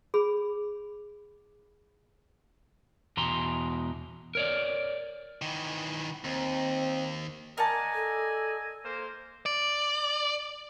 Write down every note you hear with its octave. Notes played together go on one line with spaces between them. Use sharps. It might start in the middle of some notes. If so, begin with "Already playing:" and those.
G#4 B5
E2 B2 A#5 C6
A#4 C#5 D5
D#3 E3
D#2 C4
A#4 D5 D#5 F#5 G#5 A5
A4
A#3 C5
D5